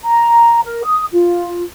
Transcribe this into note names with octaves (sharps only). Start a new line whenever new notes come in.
A#5
A#4
D#6
F4